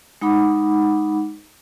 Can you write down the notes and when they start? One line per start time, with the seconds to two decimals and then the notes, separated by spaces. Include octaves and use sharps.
0.21 G#3 D#4 F#5 B5 D6